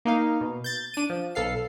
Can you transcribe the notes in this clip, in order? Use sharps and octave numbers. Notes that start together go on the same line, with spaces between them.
A#3 D#4 F5
B2
G6 A6
D4 D#7
F3
B1 A4 F5 C7